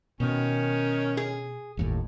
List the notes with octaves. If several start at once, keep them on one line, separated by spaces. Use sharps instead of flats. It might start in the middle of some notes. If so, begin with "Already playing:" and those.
B2 D#3 C#4
G#4
G1 D#2 A2